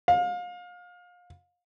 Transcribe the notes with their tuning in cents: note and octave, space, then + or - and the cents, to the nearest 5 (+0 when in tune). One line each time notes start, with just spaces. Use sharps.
F5 +30